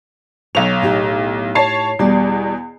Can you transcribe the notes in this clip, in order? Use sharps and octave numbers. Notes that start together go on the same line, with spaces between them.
B1 C#5 F7
A2 D#4 G4
C#5 A5 C7
E2 B2 G3 D5